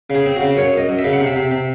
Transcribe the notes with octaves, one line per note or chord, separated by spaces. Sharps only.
C#3 G#4
C4
C#3 F#4
F#2 C#5
F#2 D#5
F#2
E5
C#3
F#5
C3
E5
C3
C3